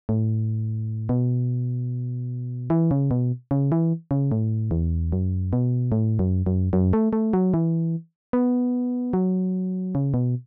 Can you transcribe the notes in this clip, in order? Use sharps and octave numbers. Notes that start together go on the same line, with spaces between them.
A2
B2
E3
C#3
B2
C#3
E3
C#3
A2
E2
F#2
B2
A2
F#2
F#2
F#2
A3
A3
F#3
E3
B3
F#3
C#3
B2